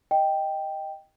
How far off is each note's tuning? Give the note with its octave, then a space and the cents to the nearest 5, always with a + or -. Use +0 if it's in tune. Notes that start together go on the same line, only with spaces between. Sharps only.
D#5 +0 G5 +0